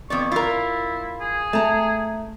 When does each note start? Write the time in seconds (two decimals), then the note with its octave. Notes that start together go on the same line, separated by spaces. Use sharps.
0.10 F2 B3 D5 C#6
0.32 E4 F4 A#4
1.21 G#4
1.53 A3 A5 A#5